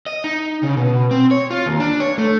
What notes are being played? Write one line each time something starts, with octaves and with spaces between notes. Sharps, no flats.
D#5
D#4
C#3
B2
C4
C#5
F4
D#2
D4
C#5
A3